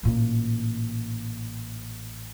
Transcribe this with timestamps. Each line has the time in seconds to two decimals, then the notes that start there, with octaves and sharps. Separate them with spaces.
0.03 A1 A#2